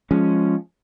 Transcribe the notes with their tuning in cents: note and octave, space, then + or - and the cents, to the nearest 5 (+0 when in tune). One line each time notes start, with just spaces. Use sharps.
F3 +0 G#3 +0 C#4 +0